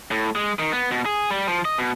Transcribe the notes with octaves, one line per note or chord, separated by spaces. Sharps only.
A2
G#3
D#3
B3
B2
G#4
G3
F3
D#5
B2